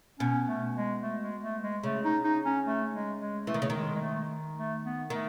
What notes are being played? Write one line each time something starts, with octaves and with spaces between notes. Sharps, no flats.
B2 C#4
A3
G#3
A3
G#3
A3
G#3
C#3 A3
D#4
D#4
C#4
A3
G#3
G#3
E3 A3
D#3
C#3
D#3 G#3
G#3
A3
A3
B3
D#3 A3